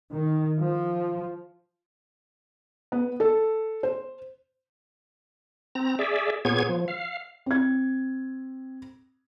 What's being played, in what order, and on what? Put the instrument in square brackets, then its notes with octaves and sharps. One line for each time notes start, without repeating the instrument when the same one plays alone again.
[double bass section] D#3
F3
[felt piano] B3
A4
C5
[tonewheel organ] C4 A#5
G#4 D5 E5
A#2 B3 G#4 C#5 G#6
F3
F5
[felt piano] C4 G#6